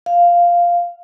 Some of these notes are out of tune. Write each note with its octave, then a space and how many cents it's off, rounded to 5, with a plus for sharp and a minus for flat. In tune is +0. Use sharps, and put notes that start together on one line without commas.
F5 -5